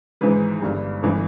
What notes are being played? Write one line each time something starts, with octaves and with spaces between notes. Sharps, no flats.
G#1 G#2 E3 B4
G1 G2 G3
G1 E3